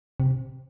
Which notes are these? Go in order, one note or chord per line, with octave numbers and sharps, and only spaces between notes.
C3